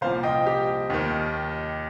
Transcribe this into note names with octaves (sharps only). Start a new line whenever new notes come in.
C2 A#2 F3 C5 F5
D#5 G5
G4
D#2 D#3